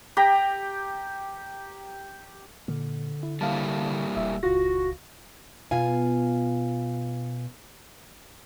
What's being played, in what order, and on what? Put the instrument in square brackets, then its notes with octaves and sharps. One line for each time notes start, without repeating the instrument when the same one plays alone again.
[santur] G4 G5 A#5
[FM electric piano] A#2 [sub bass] D3
[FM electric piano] E4
[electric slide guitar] G3 A#3 E4 [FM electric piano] F5 A5
[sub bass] D#1 [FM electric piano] E5
[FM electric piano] C#2 F4 A#6 [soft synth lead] F#4
[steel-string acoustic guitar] B2 F4 F5 G#5